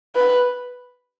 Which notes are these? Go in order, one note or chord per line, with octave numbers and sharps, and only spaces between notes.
B4